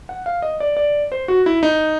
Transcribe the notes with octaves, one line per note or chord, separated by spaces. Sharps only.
F#5
F5
D#5
D5
D5
C5
F#4
E4
D#4